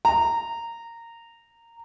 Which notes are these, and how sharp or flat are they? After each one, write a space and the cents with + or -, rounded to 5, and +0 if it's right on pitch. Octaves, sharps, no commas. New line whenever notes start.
A#5 -15